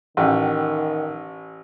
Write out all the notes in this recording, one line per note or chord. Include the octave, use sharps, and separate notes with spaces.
A1 D#3 F#5 G5